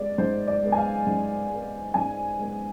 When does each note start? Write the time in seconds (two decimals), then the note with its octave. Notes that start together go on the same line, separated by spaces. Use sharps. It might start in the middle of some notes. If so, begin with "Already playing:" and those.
Already playing: G#3 B3 D5
0.18 G#2 C5
0.47 D5
0.63 G#3 B3
0.72 G#5
0.77 F5
1.06 G#2
1.50 G#3 B3
1.94 G#2 G#5
2.39 G#3 B3